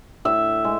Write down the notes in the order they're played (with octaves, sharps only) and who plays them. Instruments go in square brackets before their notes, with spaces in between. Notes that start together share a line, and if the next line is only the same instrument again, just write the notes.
[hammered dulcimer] A2 E5
G#3